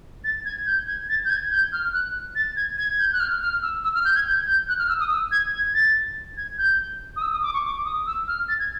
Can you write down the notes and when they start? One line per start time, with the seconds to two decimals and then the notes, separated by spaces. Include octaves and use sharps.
0.24 A6
0.45 G#6
0.67 G6
0.87 G#6
1.09 A6
1.25 G6
1.30 G#6
1.51 G6
1.73 F6
1.93 F#6
2.35 A6
2.57 G#6
2.78 G#6
2.99 G6
3.13 F#6
3.20 F6
3.41 F6
3.63 E6
3.84 E6
3.94 F6
4.05 G6
4.15 G#6
4.26 G6
4.47 G6
4.69 F#6
4.79 F6
4.89 E6
5.00 D#6
5.11 E6
5.32 G#6
5.53 G#6
5.74 A6
6.37 G#6
6.58 G6
7.16 D#6
7.22 E6
7.32 D#6
7.42 D6
7.54 C#6
7.65 D6
7.85 D#6
8.07 E6
8.28 F6
8.49 A6
8.59 G#6